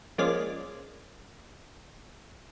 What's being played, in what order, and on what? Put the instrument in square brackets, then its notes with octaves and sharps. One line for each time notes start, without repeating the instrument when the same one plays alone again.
[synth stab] F3 G#3 A#3 C#4 D5